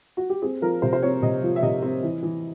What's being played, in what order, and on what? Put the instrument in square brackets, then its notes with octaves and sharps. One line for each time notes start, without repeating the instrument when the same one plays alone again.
[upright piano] F#4
G4
C4 G#4
F3 A#4
C3 C5
C5
C4 C#5
C3 D#5
F3
E5
C3 D#5
C4
E3
E3